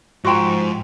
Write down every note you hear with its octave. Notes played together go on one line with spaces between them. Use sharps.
G#2 F3 F#4 G5 A#5 C6 E6